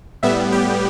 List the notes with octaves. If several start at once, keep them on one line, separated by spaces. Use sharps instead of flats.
A2 G3 B3 E5
G4